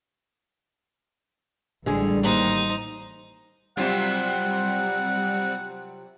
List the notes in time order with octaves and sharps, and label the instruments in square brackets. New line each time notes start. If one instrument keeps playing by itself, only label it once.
[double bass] A1 G3 [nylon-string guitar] D3 G#3 G#4
[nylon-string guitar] D#2 [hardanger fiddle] D#4 C5
[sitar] C3 F#3 F4 [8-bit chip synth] G3 C4 [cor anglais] F#5